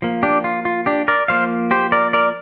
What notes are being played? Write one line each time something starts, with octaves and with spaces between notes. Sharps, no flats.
F3 A#3
D4 G4
F4
F4
D4 G4
A#4 D5
F3 A#3 C5 F5
G4 C5
A#4 D5
A#4 D5